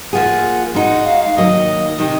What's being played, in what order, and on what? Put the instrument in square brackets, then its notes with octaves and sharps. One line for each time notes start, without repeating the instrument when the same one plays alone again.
[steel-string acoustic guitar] F3 A#3 F4 G#4 [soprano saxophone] F#5
[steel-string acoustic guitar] G#3 D#4 F#4 [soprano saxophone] F#5
[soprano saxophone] F5
F5
[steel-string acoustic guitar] D#3 F#3 A#3 [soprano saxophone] D#5
[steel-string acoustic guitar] C3 D#3 G#3 D#4 [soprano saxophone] D#5